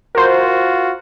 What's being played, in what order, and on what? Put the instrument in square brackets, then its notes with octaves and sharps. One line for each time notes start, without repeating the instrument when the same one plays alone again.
[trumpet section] F4 F#4 [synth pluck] A#4 C5